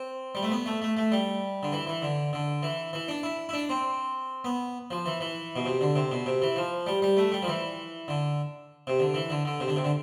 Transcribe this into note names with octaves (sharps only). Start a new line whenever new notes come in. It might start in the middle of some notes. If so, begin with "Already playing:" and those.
Already playing: C4
G3
A3
B3
A3
A3
A3
G3
D3
E3
E3
D3
D3
E3
E3
D4
E4
E4
D4
C4
B3
F3
E3
E3
B2
C3
D3
C3
B2
C3
E3
F3
G3
G3
A3
G3
F3
E3
D3
C3
D3
E3
D3
D3
C3
D3
C3
D3